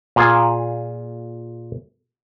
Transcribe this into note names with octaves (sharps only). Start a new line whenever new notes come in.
A#2 F4 G#4